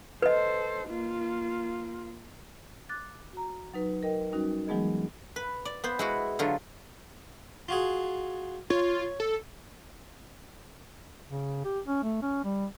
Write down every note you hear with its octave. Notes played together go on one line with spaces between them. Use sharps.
A4 B4 C5 D#5
A#3 F4
D6 F#6 A6
F#4 A#5
F#3 D#4 B4
A#4 D#5 G5
G3 C#4 D#4 F#4
E3 F#3 G#3 B3 G#4 D#5
B4
D5
B3 C5
G#3 E4 F#4
D3 F#3 F4
F4 F#4 G#4
F4 C#5
A4
C#3
G4
C#4
A3
C#4
G3